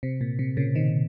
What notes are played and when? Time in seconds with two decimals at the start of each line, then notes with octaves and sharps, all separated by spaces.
0.03 C3
0.21 A#2
0.39 C3
0.57 A#2 C#3
0.75 C3 D#3